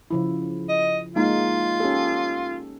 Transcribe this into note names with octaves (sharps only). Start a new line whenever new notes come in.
C#3 F3 E4
D#5
G#3 A#3 D#4 F4
C#4 G4 A4